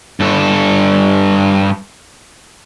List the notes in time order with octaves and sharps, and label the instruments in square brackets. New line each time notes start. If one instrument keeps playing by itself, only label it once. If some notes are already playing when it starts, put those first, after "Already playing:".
[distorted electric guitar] G2 A4